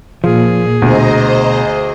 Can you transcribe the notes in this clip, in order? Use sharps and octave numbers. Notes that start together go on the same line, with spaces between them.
A#2 F3 G#4
D2 B2 C5 D#5 A#5